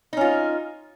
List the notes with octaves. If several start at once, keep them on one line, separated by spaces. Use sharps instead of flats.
C#4 D#4 F4